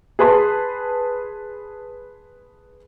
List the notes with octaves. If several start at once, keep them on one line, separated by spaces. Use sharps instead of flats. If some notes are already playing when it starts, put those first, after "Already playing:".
G#4 B4 A5 C6